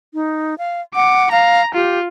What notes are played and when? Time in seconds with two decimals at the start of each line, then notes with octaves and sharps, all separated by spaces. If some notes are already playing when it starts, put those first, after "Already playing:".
0.14 D#4
0.58 F5
0.95 F#5 D6
1.32 F5 A#5
1.75 F4 G4